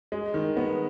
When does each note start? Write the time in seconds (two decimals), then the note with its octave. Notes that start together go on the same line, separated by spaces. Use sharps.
0.12 G#3
0.34 D#3
0.57 B3